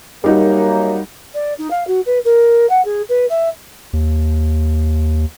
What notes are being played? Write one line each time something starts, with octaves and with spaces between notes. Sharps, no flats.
F#2 G3 A#3 D#4 F#4
D5
D#4
F5
F#4
B4
A#4
F#5
G#4
B4
E5
D#2